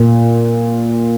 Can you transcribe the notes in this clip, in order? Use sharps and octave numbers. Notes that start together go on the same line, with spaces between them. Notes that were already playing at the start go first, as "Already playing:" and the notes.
Already playing: A#2